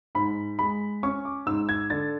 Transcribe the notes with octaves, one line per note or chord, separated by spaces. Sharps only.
G#2 B5
G#3 B5
C#4 C#6
D6
G#2 E6
G#6
D3 A6